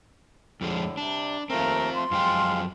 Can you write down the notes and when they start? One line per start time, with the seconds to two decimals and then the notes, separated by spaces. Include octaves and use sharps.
0.61 F2 A2 D3 F3 G#3
0.97 C3 G3 D4
1.50 D#2 A3 C4 F4 A#4
1.94 A3 C6
2.11 F#2 F3 G#3 F5 G5